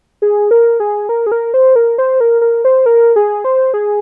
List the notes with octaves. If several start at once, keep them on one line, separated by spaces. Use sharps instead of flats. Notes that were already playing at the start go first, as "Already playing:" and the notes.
G#4
A#4
G#4
A#4
G#4
A#4
C5
A#4
C5
A#4
A#4
C5
A#4
G#4
C5
G#4